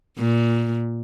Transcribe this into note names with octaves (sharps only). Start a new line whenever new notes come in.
A#2